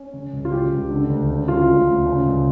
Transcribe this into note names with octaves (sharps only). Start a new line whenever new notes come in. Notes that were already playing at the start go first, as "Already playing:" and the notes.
Already playing: C#4
C#3
C#2
F4
C#3 G4
C#2
D3
D2
C#3
C#2 F4
C#3
D2
C#3
C#2